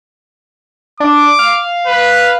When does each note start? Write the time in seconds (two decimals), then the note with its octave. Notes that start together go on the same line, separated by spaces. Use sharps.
1.00 D4 D6
1.39 F5
1.87 B4